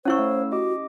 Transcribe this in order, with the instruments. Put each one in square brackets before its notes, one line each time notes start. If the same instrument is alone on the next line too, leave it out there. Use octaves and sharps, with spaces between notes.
[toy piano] C#4 E4 C#6 [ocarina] C5 [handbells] C#5 F5 E6
[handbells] A3
[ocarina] F#4 [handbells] G4 D#5 D6